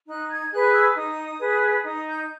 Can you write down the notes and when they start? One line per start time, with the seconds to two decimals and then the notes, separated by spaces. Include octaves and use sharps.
0.07 D#4 F#6
0.29 G#6
0.51 G#4 B4 F#6
0.73 E6
0.95 D#4 D#6
1.39 G#4 B4
1.84 D#4 D#6
2.06 G6